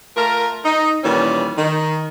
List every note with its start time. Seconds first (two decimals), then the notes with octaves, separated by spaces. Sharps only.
0.17 A3 F4 A#4
0.65 D#4
1.04 A#2 D#3 E3 G3 C#4
1.58 D#3